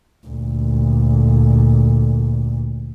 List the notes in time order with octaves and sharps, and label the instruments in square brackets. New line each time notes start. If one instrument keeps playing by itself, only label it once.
[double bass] D2 A#2